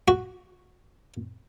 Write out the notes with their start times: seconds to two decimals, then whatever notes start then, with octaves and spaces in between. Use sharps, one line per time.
0.08 F#4